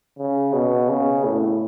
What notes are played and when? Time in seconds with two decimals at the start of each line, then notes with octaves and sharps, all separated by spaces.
0.18 C#3
0.53 B2
0.89 C#3
1.24 A2